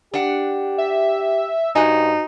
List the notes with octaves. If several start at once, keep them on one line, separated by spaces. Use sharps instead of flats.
D4 G4 F#5
E5
G2 D#4 F#4 C5 G#5